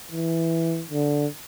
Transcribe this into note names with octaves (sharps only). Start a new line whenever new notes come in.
E3
D3